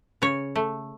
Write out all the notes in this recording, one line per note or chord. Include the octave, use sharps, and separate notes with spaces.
C#3 C#5
A3